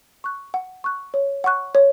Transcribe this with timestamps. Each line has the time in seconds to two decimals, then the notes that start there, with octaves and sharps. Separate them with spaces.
0.24 C#6 F#6
0.54 F#5
0.84 C#6 F#6
1.14 C#5
1.44 F#5 C#6 F#6
1.75 C#5